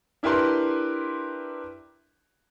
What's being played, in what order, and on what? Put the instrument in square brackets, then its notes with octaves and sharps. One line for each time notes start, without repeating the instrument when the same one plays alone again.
[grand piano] D4 E4 G4 A#4 B4 C6